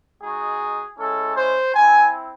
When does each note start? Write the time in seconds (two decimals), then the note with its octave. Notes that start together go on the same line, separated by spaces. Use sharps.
0.22 G#3 D#4 F#4 G#4
0.98 G#3 C#4 E4 A4
1.36 C5
1.74 C4 E4 G#5